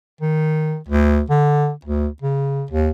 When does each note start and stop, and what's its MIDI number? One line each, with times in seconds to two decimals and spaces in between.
0.21 0.77 51
0.88 1.21 38
1.30 1.71 50
1.85 2.07 38
2.22 2.64 49
2.71 2.91 39